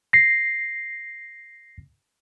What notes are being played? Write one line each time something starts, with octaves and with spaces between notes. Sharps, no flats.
A#6 C7